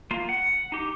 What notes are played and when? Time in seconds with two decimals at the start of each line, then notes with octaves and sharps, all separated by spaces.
0.11 A#3 F4
0.29 F#5
0.72 D#4 G4